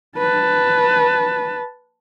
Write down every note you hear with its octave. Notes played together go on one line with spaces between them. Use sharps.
B4 A5